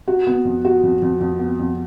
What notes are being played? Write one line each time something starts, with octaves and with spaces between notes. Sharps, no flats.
F#4
B3
F2
F#4
F2
F2
F2
B3
F2